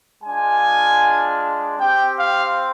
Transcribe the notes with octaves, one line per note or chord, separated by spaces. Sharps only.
G#3 D4 F4 G#5
C4 G4 G5
F5